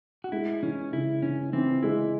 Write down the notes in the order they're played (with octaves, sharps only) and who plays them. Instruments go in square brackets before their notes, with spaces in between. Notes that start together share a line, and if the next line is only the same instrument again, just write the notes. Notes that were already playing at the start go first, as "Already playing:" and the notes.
[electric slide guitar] F#4
[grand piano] G#3 [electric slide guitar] E4
[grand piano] E3 [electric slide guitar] C#4
[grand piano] C#3 [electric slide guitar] E4
[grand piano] E3 [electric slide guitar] C#4
[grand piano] E3 [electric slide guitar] C4
[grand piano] G#3 [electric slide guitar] E4